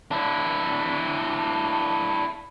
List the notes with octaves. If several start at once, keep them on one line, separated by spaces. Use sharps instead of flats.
D4 E4